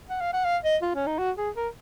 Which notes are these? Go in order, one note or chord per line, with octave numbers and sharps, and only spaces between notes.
F#5
F5
F#5
F5
D#5
F4
C#4
D#4
F#4
G#4
A#4